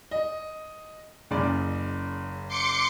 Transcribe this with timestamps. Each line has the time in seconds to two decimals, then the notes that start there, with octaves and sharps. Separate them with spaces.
0.11 D#5
1.31 F#1 C#3 D5
2.48 C6 D6 C#7